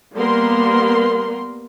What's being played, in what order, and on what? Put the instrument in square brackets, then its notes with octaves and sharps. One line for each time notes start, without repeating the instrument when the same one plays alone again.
[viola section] G3 A#3 B3 A#4 C6